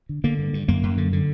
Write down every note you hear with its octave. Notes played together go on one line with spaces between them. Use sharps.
D3
D3 A#3
G2
G2
F#2 A#3
F#2
D3
D3